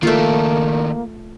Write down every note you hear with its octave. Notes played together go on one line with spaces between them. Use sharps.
D#3 A3 A#3 D4 F4